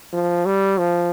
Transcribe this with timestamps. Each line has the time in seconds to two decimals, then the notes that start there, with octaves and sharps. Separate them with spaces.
0.13 F3
0.45 G3
0.78 F3